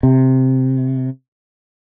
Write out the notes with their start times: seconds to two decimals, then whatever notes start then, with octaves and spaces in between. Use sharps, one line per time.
0.03 C3